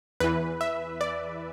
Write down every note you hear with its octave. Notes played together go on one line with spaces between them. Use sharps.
E2 E3 B4
E5
D5